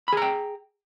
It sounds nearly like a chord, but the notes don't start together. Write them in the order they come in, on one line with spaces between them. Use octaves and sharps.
B5 G#4 A#5 G5